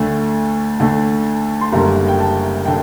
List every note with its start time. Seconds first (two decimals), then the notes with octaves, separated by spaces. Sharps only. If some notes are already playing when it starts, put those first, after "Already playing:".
Already playing: D2 D3 A3
0.80 D2 D3 A3
1.61 C6
1.72 F#1 F#2 D3 G3 A#5
2.08 G5
2.19 A5
2.66 D3 G5